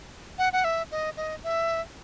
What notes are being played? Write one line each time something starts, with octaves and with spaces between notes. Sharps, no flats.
F#5
F#5
E5
D#5
D#5
E5